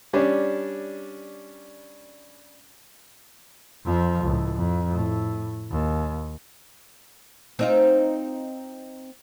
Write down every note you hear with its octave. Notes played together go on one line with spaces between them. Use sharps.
G3 C#4 D4
F2 F3
C#2 A2
F2
A2
D#2
C4 D#4 F4